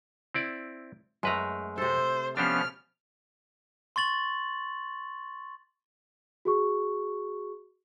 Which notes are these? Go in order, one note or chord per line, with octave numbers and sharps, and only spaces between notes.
C4 E4 D5
F#2 G#3 A3 B4 A#5
C3 A4 C5
F3 B3 C#4 D4 G4 C5 F6
C6 C#6 A6 F#7
F#4 G#4 C#6